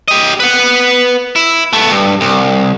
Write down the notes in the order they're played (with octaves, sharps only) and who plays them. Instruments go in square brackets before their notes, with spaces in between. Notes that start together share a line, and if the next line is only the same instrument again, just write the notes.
[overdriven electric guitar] G4 D#5
B4 F#5
E4
A3 B3
G2
C2